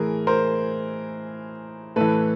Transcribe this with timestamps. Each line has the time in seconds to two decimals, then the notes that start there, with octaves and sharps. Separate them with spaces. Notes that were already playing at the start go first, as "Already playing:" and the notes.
Already playing: A2 E3 G#4 A#4
0.27 A#4 C5
1.96 A2 E3 A4 B4